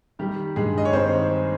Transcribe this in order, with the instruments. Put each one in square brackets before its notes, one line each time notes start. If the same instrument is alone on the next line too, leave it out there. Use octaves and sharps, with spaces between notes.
[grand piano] D#3 G3 G4
G2 G#3 G#4
D#5
C#5
D#3 C4 C5